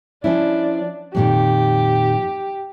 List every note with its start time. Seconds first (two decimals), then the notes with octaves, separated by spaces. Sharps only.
0.24 F3 C#4 D4 E4
1.15 F2 A#2 D#3 G4